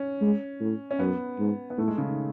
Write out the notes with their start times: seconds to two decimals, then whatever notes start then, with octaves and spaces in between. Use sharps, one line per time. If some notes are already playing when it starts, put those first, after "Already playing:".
Already playing: C#4
0.21 G#3
0.60 A2
0.91 C#4
0.99 F#2 B3
1.39 G#2
1.70 B3
1.78 A2 A3
1.88 G#3
1.98 C#3
2.07 D#3